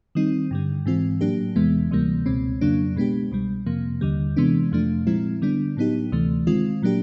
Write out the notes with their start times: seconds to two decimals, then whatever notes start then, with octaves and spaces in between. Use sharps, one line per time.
0.15 D#3 G3 C4 D#4
0.51 G2 D3 G3
0.86 G#2 E3 G#3 C4 F4
1.21 A2 F#3 A#3 D4 G4
1.56 E2 C3 E3 G#3 B3
1.91 D2 C3 E3 G3 A#3
2.26 C#2 B2 G#3 C4
2.61 F2 C#3 F#3 A#3 D4
2.96 B2 G#3 B3 D4 G4
3.32 C2 B2 G3
3.66 F2 C3 F3 A#3
4.01 D#2 D3 G3
4.36 C3 E3 G#3 B3 D4
4.72 F2 C3 F3 A3 D4
5.07 A#2 F3 G#3 C4 E4
5.42 D3 G3 B3 D4
5.77 A2 F#3 B3 D#4 G4
6.12 D2 C3 E3 A3
6.47 D#3 G#3 C4 F4
6.82 A#2 F#3 A#3 D4 G4